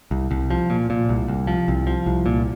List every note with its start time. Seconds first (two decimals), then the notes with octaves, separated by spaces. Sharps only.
0.11 C2
0.31 C2
0.51 F3
0.70 A#2
0.90 A#2
1.09 C2
1.28 C2
1.47 F3
1.68 C2
1.87 F3
2.06 C2
2.26 A#2